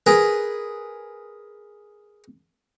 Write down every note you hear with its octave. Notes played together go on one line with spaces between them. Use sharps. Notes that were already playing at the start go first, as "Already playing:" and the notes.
G#4 A#4 B4